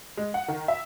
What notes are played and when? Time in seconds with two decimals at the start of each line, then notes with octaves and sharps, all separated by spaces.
0.17 G#3
0.34 F#5
0.48 D#3
0.68 E5